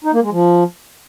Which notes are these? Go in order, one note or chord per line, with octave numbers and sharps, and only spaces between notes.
D#4
A#3
G#3
F3